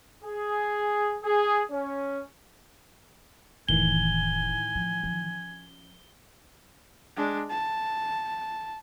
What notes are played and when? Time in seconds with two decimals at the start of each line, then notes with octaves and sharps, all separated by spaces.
0.24 G#4
1.24 G#4
1.70 C#4
3.69 F1 A2 D#3 E3 C#4 G#5 G7
4.75 F3
5.03 F3 C#4
7.17 G#3 D4
7.50 A5